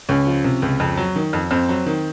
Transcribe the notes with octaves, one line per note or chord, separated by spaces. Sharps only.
C#2 C#4
F3
C3
C#2
F2
F#3
D#3
F2
F2 C4
F#3
D#3